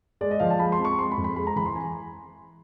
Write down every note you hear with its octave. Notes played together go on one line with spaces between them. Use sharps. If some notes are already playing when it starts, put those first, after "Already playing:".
G#3 D5
D#5
F3 F5
A5
G#3 B5
C6
C4
C#6
G#3 C6
B5
F2
B5
G#3 B5
A#5
E3 B5
C6
G#5